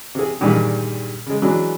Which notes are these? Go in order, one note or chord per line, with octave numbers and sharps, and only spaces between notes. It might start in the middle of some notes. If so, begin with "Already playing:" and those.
C3 G#4
G2 A#2 D#3 G3 G#3 D4
C#3 G#3
E3 F#3 G#3 D4